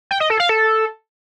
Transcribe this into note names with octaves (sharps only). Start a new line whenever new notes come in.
G5
D#5
A4
F5
A4